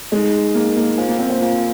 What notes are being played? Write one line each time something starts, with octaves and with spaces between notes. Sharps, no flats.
G#3 D#4 G#4 D#5
A#3 D#4 G#4 D#5
A#3
F4 C5 F5 G#5
A#3
C4
C4
A#3 F4 C5 F5 G#5